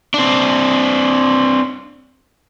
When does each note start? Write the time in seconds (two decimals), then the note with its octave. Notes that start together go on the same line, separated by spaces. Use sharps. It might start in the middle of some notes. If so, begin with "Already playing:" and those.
0.14 C4 D4